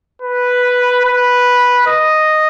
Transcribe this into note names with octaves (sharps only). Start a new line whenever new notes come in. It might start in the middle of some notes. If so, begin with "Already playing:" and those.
B4
B4
D#5